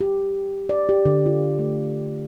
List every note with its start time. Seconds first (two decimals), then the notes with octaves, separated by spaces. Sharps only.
0.01 G4
0.69 D5
0.89 G4
1.05 D3
1.26 F4
1.59 A3